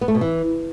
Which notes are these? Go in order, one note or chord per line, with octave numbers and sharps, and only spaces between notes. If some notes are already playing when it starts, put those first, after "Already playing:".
B3
A3
B2
E3